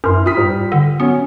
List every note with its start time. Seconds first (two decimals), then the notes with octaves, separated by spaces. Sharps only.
0.04 F#2 E4 B4 C6 F6
0.26 F4 D#6 F6 B6
0.37 G#2 G3
0.72 D3
1.00 F#3 B3 C#4